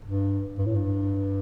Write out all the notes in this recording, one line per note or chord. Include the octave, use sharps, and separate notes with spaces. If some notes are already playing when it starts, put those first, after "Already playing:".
G2
G2
A2
G2